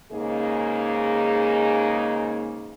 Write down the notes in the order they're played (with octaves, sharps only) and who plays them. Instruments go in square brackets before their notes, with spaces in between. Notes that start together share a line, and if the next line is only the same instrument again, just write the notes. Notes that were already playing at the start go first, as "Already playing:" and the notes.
[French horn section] G#2 C#3 A#3 D#4 G#4 D#5